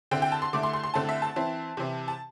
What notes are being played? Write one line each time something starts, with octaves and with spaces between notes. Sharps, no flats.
D3 C4 E4 G5
G5
A5
C6
D3 A3 E4 D6
C6
C6
C6
D3 A3 C4 E4 A5
E5
A5
E3 C4 E4
C3 E3 C4 E4
A5